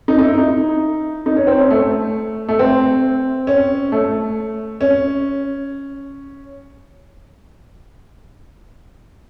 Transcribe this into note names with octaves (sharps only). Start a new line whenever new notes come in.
D#4
D#4
E4
D#4
D#4
C#4
C4
C#4
A3
A3
C4
C#4
A3
C#4